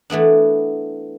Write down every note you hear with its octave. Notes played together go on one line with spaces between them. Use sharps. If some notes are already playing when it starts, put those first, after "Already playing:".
E3 A3 B3 D4